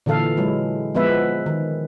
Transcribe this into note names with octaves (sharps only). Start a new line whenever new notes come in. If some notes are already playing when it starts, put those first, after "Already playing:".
A#2 D3 E3 A4 F5
F#3 G#3 E4
F3 G#3 B3 B4 E5
D#3